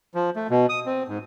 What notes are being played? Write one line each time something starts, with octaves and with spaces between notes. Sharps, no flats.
F3
A3
B2
D#6
C4
G#2